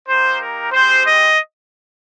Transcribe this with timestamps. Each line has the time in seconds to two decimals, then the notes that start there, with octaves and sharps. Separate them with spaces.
0.08 A#3 D#4 G4 C5
0.40 A#4
0.72 G#3 C4 G4 C5
1.04 D#5